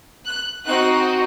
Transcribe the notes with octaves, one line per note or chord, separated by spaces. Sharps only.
F#6
C4 D#4 F#4 F#6